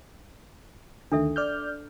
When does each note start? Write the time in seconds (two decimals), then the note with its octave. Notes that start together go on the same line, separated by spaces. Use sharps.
1.12 D2 D#3 D4 A4 E5
1.36 D5 F6 G6